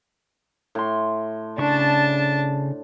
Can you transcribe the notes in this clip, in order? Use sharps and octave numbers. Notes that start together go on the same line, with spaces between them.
A2 A3 C6
C#3 D4 A5 C#6